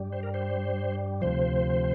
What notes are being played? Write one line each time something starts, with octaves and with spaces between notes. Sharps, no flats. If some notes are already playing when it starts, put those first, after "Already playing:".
Already playing: G2 G3
C5
A#4
C5
D2 C3 F3 C5